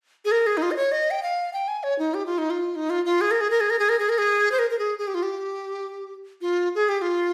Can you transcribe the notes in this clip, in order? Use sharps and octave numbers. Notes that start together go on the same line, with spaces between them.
G#4
A#4
G#4
D#4
F4
D#5
C#5
D#5
G5
F5
G5
G#5
C#5
D#4
G4
F4
D#4
F4
D#4
F4
F4
G#4
A#4
G#4
A#4
G#4
A#4
G#4
A#4
G#4
A#4
G#4
C5
A#4
A#4
G#4
G#4
G4
F4
G4
F4
G#4
G4
F4